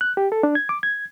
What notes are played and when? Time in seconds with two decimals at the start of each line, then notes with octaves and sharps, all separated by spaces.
0.01 F#6
0.17 G4
0.32 A4
0.43 D4
0.55 G#6
0.69 D6
0.83 G#6